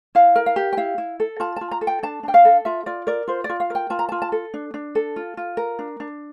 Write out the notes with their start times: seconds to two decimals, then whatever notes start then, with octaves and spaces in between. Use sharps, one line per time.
0.15 E4 F5
0.36 A#4
0.46 F5
0.56 G4
0.73 G5
0.77 E4 F5
0.98 E4
1.20 A4
1.40 F4 A5
1.56 F4 A5
1.71 A#5
1.81 A4
1.87 G5
2.03 D4 A5
2.23 D4 G5
2.34 F5
2.45 A4
2.65 F4 E5
2.86 F4 D5
3.07 A#4 D5
3.28 F4 C5
3.44 D5
3.49 F4
3.60 F5
3.70 A#4 G5
3.90 F4 A5
3.99 A#5
4.09 F4 A5
4.22 A5
4.32 A4
4.54 D4
4.74 D4
4.95 A4
5.16 F4
5.37 F4
5.57 A#4
5.79 D4
6.00 D4